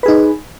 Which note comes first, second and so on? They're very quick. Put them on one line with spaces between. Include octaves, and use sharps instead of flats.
B4 G#4 D#4